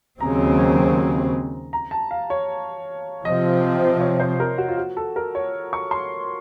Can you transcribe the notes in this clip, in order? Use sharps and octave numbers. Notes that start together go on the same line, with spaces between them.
D#2 C#3 F#3 C4 A#5
A#5
A5
F5
C#5
C3 F3 C4 D#5
C#5
C5
A#4
F#4
F4
F#4
A4
A#4
C#5
C#6
C6